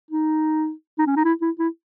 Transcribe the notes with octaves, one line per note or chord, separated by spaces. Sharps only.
D#4
D#4
C#4
D#4
E4
E4
E4